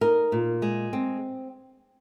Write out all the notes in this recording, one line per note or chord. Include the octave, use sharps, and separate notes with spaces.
D#4 A#4
A#2
G#3
C4